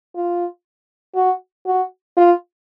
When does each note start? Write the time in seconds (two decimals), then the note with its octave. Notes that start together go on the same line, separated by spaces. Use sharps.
0.15 F4
1.16 F#4
1.66 F#4
2.17 F4